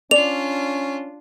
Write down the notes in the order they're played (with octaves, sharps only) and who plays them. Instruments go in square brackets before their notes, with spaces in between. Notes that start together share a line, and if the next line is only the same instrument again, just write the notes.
[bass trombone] C#4 [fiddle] D4 F4 [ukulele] D5 [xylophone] F7